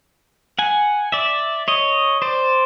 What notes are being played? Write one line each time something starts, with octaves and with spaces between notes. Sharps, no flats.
F#5 G#5
D5 E5
C#5 D#5
C5 D5